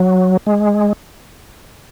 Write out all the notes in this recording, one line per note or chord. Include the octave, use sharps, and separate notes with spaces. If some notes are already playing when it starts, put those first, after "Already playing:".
Already playing: F#3
G#3